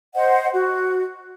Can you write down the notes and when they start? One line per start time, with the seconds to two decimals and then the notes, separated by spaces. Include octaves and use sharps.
0.15 C5 D#5 F#5
0.53 F#4